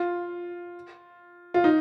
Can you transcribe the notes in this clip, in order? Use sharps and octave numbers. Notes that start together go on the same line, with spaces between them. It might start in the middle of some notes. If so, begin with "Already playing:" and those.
Already playing: F4
F4
D#4